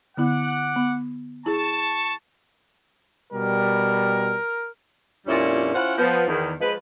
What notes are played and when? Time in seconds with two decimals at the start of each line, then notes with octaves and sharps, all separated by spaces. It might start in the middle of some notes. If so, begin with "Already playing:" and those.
0.17 D3 B3 E4 F#5 D6
0.76 B3
1.46 E4 G#4 A5 C#6
3.33 B2 G3 A#4
5.26 F2 A#2 G3 C#4 D4 E4
5.74 C#4 E4 F4 C5 F#5
5.98 F3 B3
6.28 E2 D#3
6.60 F3 G#3 B4